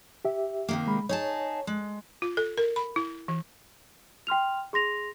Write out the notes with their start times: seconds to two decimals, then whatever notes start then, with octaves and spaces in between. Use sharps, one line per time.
0.25 G4 E5
0.69 C3 D#3 A#3
0.87 G#3 B5
1.09 D#4 G#4 C#5 A5
1.67 G#3
2.22 F4
2.37 A4
2.58 A#4
2.76 B5
2.96 E4
3.28 E3
4.27 G5 C6 F6 F7
4.73 G#4 C6 A#6 F7